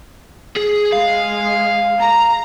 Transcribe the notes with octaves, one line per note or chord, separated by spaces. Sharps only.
G#4
G#3 G#4 F5
A#5